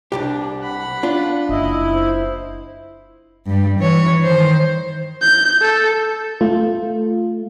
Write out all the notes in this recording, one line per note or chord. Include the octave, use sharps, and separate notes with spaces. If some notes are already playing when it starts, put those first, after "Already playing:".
C2 G2 D4 G4
F#5 B5
D4 F4
F#1 E4 D#5
C5
G2 G3
E3 C#5
D#3 C5
G6
A4
A3 F4